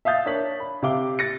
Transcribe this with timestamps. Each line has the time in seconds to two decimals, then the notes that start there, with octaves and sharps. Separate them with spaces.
0.05 E5 F5 D#6 G6 A6
0.26 D4 A#4 C#5 B6 F#7
0.60 B5
0.82 C3 F5 D6 G7
1.19 A6 A#6 C#7